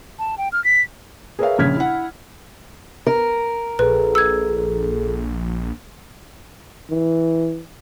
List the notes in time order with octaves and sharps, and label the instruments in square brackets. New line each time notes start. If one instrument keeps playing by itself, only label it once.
[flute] A5
G5
F6
B6
[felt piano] G#4 A#4 B4 C#5 E5 F5
A#1 C#3 F6 G#6 B6
E4 F#5
[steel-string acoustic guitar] A#4
[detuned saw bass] A#1 [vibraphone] G#4 A4 [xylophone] B4
[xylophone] E6 G#6
[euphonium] E3